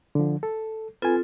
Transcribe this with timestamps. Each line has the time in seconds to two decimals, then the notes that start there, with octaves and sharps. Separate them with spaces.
0.15 D3 F3
0.43 A4
1.02 C4 F4 A4 B4 G#5